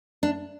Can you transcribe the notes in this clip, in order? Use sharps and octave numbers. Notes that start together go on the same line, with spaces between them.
D4